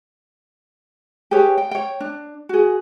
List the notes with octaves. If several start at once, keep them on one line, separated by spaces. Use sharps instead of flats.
G4 G#4 B4 C#5
G5
C#5 G5
D4
F#4 G#4